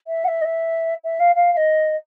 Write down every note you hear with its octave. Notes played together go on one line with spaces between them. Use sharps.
E5
F#5
E5
D#5
E5
E5
F5
F5
F5
D#5